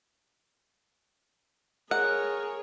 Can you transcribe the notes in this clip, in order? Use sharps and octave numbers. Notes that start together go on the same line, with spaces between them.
G#4 A#4 C#5 F#5